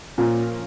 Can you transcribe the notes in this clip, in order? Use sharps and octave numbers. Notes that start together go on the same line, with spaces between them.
A#2 F3 A#3 C#4 F4 A#4